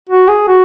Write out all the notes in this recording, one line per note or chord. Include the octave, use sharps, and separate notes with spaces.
F#4
G#4
F#4